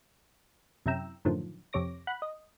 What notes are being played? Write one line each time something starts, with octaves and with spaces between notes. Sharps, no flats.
F#2 C3 E4 G5 A#5 E6
F#2 A2 D3 D#3 F3
F2 C3 C#5 D6 A#6
F#5 B5 F#6
D#5